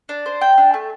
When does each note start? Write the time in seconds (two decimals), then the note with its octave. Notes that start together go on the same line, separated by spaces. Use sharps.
0.09 D4
0.26 C5
0.41 G5
0.58 D4
0.74 A3